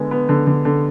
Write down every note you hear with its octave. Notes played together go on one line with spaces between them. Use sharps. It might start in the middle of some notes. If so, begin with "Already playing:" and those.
Already playing: D3 G#3 B3
B3
D3
D3
D3